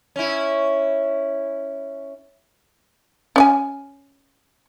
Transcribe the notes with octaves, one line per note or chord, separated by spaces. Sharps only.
C#4 E4
C#4 D5 G#5